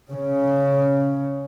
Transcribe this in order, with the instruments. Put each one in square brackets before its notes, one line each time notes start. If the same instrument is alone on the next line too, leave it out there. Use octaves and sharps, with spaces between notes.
[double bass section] C#3